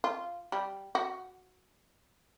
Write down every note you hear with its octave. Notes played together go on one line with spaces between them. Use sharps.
F4
G3
F#4